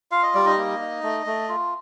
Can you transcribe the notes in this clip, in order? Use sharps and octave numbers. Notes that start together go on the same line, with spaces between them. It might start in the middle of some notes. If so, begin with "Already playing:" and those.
F4 F5
D#5
G3 D5
D#4 D#5
A#3
D#4
A3
A3
F4